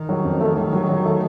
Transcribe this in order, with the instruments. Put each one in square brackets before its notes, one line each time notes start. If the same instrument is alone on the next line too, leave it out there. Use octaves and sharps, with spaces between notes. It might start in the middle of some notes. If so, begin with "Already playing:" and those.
Already playing: [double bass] D#3
[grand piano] F#3
F2
A3
F#3
F#3
F#3
A3